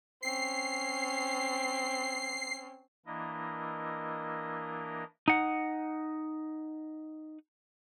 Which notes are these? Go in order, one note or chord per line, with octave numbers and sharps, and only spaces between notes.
C4 C#4 C7
E3 A#3 D4 E4 A#4 D#5
D#4 F#5